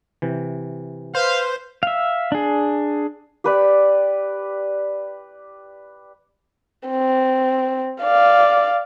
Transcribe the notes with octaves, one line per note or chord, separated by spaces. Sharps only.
C3 E3
B4 C5 F5
E5 F5
D4 G#4
G4 B4 D5
C4
D5 F5